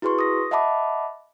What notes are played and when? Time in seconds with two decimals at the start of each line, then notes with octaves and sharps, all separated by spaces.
0.02 E4 F#4 G#4 B4 C6 C#6
0.19 D#6 A#6
0.51 D#5 E5 F#5 A5 B5 D6